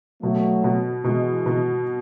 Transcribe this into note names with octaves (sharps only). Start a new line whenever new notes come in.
B2 F#3 A3
B2
B2 E3 G#3
B2